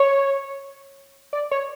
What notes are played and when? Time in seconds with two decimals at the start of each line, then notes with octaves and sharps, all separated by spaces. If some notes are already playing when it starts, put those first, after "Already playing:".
Already playing: C#5
1.33 D5
1.51 C#5